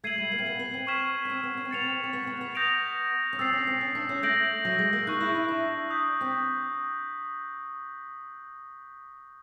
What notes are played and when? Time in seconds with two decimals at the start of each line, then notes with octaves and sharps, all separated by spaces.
0.04 A3 G#6 C7 D#7 F#7
0.18 G3
0.32 A#3
0.39 C4
0.46 B3
0.59 B3
0.74 C4
0.87 C#6 F6 G#6 B6 E7
1.25 C#4
1.30 C4
1.43 B3
1.57 C#4
1.65 C4
1.71 B3 A6 C#7 F7
1.81 C4
2.04 C4
2.13 B3
2.27 B3
2.41 B3
2.55 D#6 G6 A#6 D7 F7
3.33 C#4
3.39 C4 E6 A6 C7
3.53 C#4
3.67 C4
3.81 C#4
3.95 D4
4.09 C#4
4.23 A3 G6 A#6 D7 F#7
4.65 F#3
4.79 G#3
4.93 A#3
5.07 D#4 C#6 F#6 A#6
5.20 E4
5.35 E4
5.48 D4
5.90 D#6 G6 B6
6.21 C4